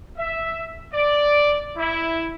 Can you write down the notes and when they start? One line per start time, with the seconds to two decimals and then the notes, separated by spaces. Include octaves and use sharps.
0.17 E5
0.92 D5
1.77 E4